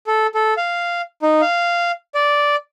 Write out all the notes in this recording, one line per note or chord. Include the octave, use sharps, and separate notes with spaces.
A4
A4
F5
D#4
F5
D5